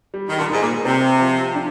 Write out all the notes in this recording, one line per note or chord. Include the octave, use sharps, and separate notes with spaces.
G3
D#3
A#2 D3
G#2 D#4
A#2
C3 C4
F3
D4